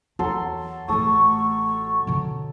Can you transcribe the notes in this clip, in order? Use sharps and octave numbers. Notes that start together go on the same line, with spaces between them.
E2 F#3 A4 C6
A1 A3 A4 C#6 D#6
B2 D3